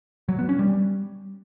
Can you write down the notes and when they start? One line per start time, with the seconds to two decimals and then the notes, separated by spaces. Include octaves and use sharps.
0.29 F#3
0.39 B3
0.49 C#4
0.59 G3